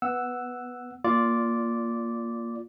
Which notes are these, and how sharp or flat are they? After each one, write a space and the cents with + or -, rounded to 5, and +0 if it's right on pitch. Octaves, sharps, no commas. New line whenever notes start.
B3 +0 F#5 +0 E6 +0
A#3 +0 F4 +0 D5 -10